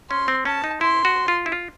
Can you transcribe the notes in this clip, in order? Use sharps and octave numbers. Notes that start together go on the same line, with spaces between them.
C#4 C6
C4
C#4 A5
D#4
E4 C6
F#4
F4
E4
F4